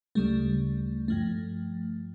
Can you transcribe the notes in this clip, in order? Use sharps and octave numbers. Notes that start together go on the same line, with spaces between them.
D2 C#3 G3 A3
G2 F3 A3